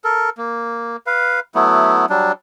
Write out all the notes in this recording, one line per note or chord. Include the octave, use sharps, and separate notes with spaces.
A4 A#4
A#3
B4 F5
F#3 A3 B3 E4
F#3 G3 D4